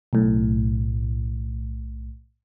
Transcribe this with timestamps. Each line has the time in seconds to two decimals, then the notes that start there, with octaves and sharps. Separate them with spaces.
0.13 B1 A2